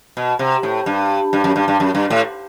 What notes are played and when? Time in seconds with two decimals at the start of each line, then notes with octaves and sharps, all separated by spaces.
0.17 B2
0.39 C3
0.63 A2
0.86 G2
1.33 G2
1.44 F#2
1.56 G2
1.68 G2
1.80 F#2
1.95 G2
2.10 A2